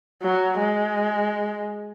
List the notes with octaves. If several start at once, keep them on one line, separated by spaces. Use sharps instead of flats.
F#3
G#3